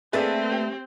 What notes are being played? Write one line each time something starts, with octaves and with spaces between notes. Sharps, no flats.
A3 A#3 C4 D4 G#4 B4 E5 A6
G4